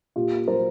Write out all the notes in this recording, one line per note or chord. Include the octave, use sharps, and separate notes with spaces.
A#2 F4 G4
A#3
F#3 A#4 C5